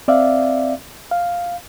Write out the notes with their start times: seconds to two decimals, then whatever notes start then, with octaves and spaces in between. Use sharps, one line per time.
0.08 C4 D5 E5 F5
1.11 F5